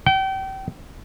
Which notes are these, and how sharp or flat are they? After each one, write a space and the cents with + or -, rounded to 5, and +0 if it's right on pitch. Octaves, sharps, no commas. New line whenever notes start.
G5 -35